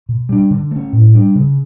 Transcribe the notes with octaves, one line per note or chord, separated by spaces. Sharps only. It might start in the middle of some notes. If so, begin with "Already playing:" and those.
B2
G3 D4
D3
A3 C#4
A2
G3 D4
C#3